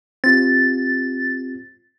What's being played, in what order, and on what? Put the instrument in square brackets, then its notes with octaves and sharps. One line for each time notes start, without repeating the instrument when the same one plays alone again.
[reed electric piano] C4 F4 G4 [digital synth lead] A6